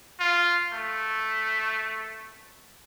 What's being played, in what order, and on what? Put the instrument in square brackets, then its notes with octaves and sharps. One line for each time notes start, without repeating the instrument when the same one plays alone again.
[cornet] F4
A3